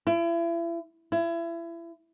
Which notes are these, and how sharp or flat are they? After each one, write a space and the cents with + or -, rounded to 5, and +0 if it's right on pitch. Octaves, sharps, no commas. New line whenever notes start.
E4 +35
E4 +30